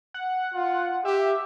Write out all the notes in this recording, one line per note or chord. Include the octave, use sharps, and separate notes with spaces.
F#5
F4
G4 E5